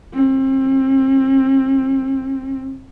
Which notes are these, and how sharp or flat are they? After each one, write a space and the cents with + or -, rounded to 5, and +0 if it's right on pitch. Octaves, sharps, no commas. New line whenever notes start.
C4 +35